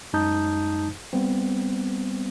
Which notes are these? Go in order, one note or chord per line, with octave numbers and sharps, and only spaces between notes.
F#2 G#3 D#4 A5 D#6 G6
G3 B3 C4